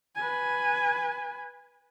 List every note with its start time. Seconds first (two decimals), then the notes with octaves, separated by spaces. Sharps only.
0.16 B4 G#5